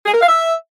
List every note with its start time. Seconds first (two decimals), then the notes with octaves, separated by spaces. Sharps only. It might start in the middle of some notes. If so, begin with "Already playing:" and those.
0.06 G#4
0.14 A#4
0.21 F5
0.29 E5